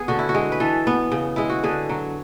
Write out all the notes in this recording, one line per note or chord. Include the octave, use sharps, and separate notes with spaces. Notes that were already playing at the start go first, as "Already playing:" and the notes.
Already playing: B3 G#4
D3 F#4
E4
F#4
G#3
B4
E3 A4
B3
C#3
G#3 E4
F#4
D3 G#4
F#3